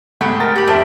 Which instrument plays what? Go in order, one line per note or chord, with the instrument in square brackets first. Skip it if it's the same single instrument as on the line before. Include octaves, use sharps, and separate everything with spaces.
[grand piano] G#2 A3 F#5 [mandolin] G4 G#4 B5
[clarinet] A#4 [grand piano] A#5 A6
[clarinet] G4 [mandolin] B5 G6
[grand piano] F2 E5 [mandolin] C4 D4